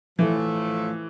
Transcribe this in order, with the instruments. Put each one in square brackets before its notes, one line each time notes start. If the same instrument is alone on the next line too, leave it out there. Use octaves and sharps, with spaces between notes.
[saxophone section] A2 F3 A3 [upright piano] E3